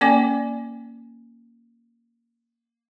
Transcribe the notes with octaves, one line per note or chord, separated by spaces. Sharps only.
A#3 C#4 D5 G#5 D6